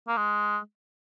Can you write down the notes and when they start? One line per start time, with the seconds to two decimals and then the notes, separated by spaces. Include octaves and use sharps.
0.08 A#3
0.17 G#3